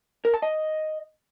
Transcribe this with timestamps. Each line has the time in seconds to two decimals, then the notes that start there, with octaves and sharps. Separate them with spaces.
0.25 A#4
0.34 A5
0.42 D#5